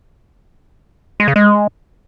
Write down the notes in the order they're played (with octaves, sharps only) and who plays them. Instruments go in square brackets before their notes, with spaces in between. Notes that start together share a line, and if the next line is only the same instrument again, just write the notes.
[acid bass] G#3
C#3
G#3